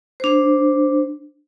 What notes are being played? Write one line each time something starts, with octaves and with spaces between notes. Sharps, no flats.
D4 C5